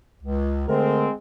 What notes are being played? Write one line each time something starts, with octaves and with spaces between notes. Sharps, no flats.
C#2
D3 G#3 A3 C4 A#4